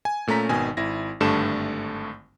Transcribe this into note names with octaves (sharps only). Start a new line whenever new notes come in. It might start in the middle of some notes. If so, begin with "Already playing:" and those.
G#5
A#2 A3 C#4 A#5 B6
G#1 B2 D#3 G#5
G#1 E4 A#6
G#1 G2 D3 A3 A5 E7